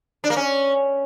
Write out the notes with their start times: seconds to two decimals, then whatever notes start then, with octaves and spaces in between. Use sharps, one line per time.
0.24 D4
0.30 A#3
0.36 C#4